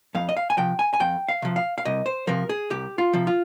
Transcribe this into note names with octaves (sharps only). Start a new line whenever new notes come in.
F2 F5
D#5
F5
G#5
C3 F3 G5
G#5
G#5
F2 G5
F5
C3 F3
F5
F5
C2 D#5
C5
C3 F3 A#4
G#4
C2 G4
F4
C3 F3
F4